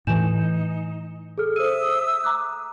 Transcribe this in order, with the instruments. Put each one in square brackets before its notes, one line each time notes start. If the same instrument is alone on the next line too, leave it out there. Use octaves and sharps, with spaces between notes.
[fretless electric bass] A2 E3 [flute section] D#4 [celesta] G#5 G6 E7
[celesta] G#4 A4 F6
[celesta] C5 D#7 [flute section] E5 D#6 E6
[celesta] A#5 D6 F#6